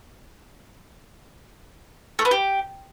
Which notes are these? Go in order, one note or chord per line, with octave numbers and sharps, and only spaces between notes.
A3
B3
G4